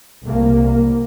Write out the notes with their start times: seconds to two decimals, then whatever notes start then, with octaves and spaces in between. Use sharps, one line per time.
0.24 C2 A#3